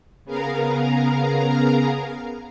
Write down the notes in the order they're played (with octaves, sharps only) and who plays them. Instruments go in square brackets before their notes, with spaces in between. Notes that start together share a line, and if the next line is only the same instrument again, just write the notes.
[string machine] C#3 B3 G#4 A#4 F5 A#5